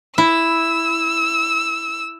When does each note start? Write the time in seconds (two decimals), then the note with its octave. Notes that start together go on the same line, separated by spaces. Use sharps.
0.18 E4 E6